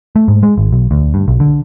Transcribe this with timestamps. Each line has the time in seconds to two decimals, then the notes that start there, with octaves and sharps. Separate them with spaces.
0.16 A3
0.28 G#2
0.43 G#3
0.58 G#1
0.73 B1
0.91 D2
1.14 G2
1.28 B1
1.40 D3